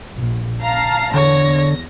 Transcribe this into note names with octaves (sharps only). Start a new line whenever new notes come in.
A#1
F5 A5 A#5
E2 D3 C#5 A#6